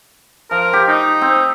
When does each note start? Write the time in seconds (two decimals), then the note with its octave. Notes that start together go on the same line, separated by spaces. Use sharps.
0.51 F3 A#4
0.73 G4 F5
0.88 D#4
1.21 C4